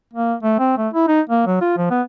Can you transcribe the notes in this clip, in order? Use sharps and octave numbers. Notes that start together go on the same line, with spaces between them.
A#3
A3
C4
A3
E4
D#4
A#3
F#3
F4
F3
B3